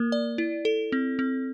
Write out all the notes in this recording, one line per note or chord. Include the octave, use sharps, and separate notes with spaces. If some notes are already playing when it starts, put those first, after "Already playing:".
Already playing: A#3 A#4
D5
E4
A4
C4
C4